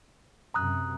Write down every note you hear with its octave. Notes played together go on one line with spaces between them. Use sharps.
F#2 C3 A#5 D#6 F#6